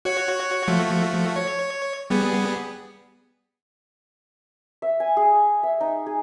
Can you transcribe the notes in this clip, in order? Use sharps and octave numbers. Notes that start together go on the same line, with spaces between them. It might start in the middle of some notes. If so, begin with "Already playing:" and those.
F#4 C#5 F#5
F3 A3 F#4
C#5
G3 B3 G#4
E5
G#5
G#4
E5
D#4
G#4